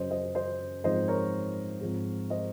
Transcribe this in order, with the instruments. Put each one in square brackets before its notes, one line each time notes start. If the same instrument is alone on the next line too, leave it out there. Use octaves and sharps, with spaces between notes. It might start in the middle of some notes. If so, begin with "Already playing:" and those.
Already playing: [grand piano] F#2 C#3 F#3 C#4 C5 D#5
C5 D#5
C5 D#5
G#2 F3 C4 D#4 C5 D#5
A#4 C#5
G#2 F3 C4
C5 D#5